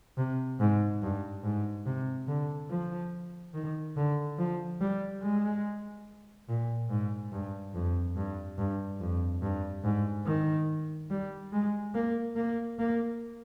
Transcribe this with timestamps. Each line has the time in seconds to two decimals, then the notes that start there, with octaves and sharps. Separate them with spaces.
0.17 C3
0.60 G#2
1.02 G2
1.43 G#2
1.86 C3
2.28 D3
2.70 F3
3.54 D#3
3.96 D3
4.39 F3
4.81 G3
5.22 G#3
6.49 A#2
6.90 G#2
7.32 G2
7.75 F2
8.16 G2
8.58 G2
9.00 F2
9.42 G2
9.84 G#2
10.26 D#3
11.10 G3
11.52 G#3
11.95 A#3
12.36 A#3
12.79 A#3